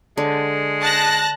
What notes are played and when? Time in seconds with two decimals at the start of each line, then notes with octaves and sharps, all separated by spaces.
0.17 D3 G#3
0.82 A5 F#6 A#6